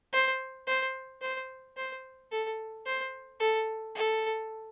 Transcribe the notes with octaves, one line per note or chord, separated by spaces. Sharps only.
C5
C5
C5
C5
A4
C5
A4
A4